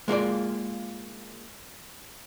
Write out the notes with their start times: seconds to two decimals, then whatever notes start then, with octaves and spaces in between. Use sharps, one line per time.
0.08 G#3 A#3 F4 D5